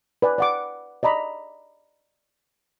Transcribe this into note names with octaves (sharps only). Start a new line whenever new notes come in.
B4 D5 G#5
D5 F#5 D6
D5 D#5 A#5 B5